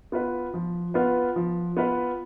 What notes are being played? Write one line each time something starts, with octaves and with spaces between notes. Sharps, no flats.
B3 F4 B4
F3
B3 F4 B4
F3
B3 F4 B4